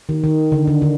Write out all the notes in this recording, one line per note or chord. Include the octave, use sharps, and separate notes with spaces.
D#3
D#3
D3
D3
D3